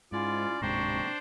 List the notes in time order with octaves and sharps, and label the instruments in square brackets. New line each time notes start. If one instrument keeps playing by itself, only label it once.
[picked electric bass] G#2 [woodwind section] C#4 E4 F4 [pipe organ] D5
[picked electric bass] D1 G#2 C3 [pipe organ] D4 C5 [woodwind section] G5 A#5 C#6